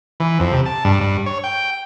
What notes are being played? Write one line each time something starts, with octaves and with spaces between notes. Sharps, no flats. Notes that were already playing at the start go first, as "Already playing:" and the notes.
E3
F2
C3
A5
G2
G2
C#5
G5